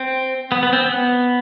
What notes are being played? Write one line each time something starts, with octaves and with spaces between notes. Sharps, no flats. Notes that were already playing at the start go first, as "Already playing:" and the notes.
Already playing: C4
B3
B3
C4
B3